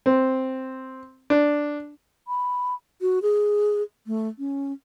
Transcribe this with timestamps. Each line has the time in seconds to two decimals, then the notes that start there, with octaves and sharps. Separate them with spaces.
0.06 C4
1.30 D4
2.28 B5
3.01 F#4
3.22 G#4
4.07 A3
4.39 C#4